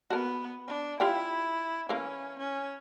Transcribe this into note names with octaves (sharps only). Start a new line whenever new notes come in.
B3 F#4 A#4
D4
E4 F4 G4 G5
E3 A#3 C#4
C#4